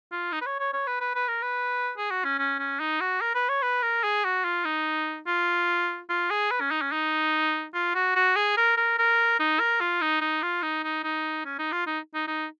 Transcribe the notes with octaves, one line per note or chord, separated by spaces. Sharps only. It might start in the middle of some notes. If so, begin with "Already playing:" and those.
F4
D#4
B4
C#5
C#5
C#5
B4
B4
B4
A#4
B4
G#4
F#4
C#4
C#4
C#4
D#4
F#4
A#4
B4
C#5
B4
A#4
G#4
F#4
F4
D#4
F4
F4
G#4
B4
C#4
D#4
C#4
D#4
F4
F#4
F#4
G#4
A#4
A#4
A#4
D#4
A#4
F4
D#4
D#4
F4
D#4
D#4
D#4
C#4
D#4
F4
D#4
D#4
D#4